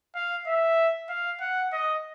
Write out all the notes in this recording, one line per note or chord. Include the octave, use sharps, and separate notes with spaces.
F5
E5
F5
F#5
D#5